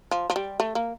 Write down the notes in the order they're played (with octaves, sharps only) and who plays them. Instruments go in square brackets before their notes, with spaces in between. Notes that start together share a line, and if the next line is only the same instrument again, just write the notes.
[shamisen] F3
F3
G3
A3
A#3